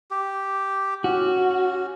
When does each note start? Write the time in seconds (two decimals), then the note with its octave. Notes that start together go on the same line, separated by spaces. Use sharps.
0.11 G4
1.04 C#4 F#4